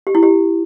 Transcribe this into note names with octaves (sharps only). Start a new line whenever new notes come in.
G4
E4
G4